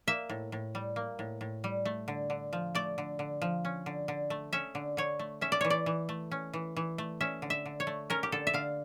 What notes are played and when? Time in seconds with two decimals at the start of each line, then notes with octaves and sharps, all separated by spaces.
0.08 A#3 E5
0.29 A2
0.52 A2
0.75 G3
0.96 A#3
1.19 A2
1.41 A2
1.64 G3
1.85 A3
2.08 D3
2.30 D3
2.53 F3
2.75 A3 D5
2.98 D3
3.19 D3
3.42 F3
3.65 C#4
3.86 D3
4.08 D3
4.30 A3
4.53 C#4 E5
4.75 D3
4.97 D3 C#5
5.19 A3
5.41 C#4 E5
5.52 D5
5.61 E3 C#5
5.70 D5
5.86 E3
6.09 A3
6.31 C#4
6.53 E3
6.76 E3
6.98 A3
7.21 C#4 E5
7.42 D3
7.50 E5
7.65 D3
7.80 C#5
7.87 A3
8.10 C#4 A#4
8.23 G4
8.32 D3 A4
8.47 E5
8.54 D3 F5